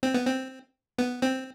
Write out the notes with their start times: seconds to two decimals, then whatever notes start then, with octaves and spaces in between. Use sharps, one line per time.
0.03 C4
0.14 B3
0.26 C4
0.98 B3
1.22 C4